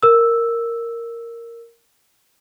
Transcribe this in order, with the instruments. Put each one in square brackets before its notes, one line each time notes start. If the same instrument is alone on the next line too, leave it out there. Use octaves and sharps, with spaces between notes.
[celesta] A#4 E6